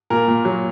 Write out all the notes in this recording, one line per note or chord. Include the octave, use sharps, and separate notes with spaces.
A#2 A#4
A#2
F#3